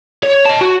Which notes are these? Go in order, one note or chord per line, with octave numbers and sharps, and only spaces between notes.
C#5
D#5 A5
F#4